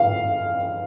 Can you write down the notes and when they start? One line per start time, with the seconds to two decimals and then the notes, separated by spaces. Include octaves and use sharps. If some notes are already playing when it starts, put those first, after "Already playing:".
Already playing: F5